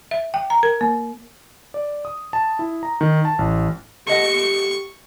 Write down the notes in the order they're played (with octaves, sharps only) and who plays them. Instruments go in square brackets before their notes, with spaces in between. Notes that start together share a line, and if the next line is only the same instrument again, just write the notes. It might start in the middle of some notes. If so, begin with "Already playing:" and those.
[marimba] E5
G5
A#5
A#4
A#3
[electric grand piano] D5
D#6
A5
E4
A#5
D#3
A5
A1
[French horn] G4 [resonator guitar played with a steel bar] A4 D#5 F#5 [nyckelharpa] C#6